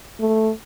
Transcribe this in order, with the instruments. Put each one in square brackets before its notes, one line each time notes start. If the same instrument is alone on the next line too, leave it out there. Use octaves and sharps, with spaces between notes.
[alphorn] A3